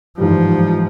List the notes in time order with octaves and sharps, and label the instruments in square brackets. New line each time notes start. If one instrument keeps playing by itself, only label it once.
[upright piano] G#2 E3 G3 [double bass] F3